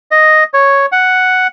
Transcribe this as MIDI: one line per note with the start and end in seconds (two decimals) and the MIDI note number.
0.11 0.44 75
0.54 0.86 73
0.92 1.47 78